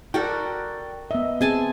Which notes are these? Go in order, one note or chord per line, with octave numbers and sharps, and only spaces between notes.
F#4 A4 A#4 D5 G5
B3 D#5 E5
C4 G#4 G#5 A5